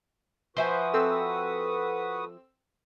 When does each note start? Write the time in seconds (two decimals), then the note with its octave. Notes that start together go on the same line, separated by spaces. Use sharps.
0.57 F3 F#4 B4 C5 E5 G#5 D#6
0.94 C4 A4 E6